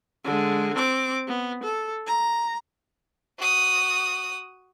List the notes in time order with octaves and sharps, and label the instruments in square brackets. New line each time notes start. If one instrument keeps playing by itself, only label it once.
[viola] D3 G#3
C4 D6
B3
A4
A#5
[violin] F#4 D#6